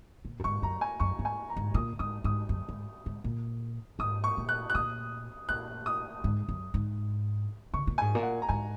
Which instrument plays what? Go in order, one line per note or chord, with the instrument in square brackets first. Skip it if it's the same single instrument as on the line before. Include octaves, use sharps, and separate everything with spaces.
[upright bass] A#2
F#2
[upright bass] G#2 [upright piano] C#6
[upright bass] F#2 [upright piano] A#5
[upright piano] G#5
[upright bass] F#2 [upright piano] C#6
[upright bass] G#2
[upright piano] G#5
A#5
[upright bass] G#2
[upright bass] A#2 [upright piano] D#6
[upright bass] G#2 [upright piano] D#6
[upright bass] G#2 [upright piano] D#6
[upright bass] F#2
G#2
G#2
A#2
[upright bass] G#2 [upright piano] D#6
[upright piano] C#6
[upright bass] A#2
[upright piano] F#6
F#6
[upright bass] A#2 [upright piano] D#6
[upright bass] A#2 [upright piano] F#6
[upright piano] D#6
[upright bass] G#2
F#2
G#2
[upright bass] C#3 [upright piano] C#6
[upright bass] A#2
[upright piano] G#5
[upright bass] G#2
A#2
[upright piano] F#5
A#5
[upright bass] G#2 [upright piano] G#5